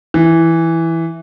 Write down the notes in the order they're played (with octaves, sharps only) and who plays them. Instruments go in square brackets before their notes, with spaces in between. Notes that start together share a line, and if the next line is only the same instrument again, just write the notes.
[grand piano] E3